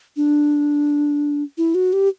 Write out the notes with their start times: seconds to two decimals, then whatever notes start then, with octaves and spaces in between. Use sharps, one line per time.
0.17 D4
1.58 E4
1.75 F#4
1.93 G4